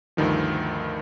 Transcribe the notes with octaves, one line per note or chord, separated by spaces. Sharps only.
D2 G2 D#3 F3